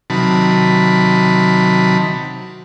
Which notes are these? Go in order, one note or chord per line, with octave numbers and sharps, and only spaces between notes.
C3 D#3 F#3 A5 B5